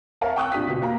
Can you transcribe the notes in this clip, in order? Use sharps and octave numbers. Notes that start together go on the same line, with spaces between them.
A#4 C#5 E5 F5 A5 A#5
G5 C#6 D#6 E6 F#6
A#2 D4 G4 D#6 B6
D2 B2
A#3 A#5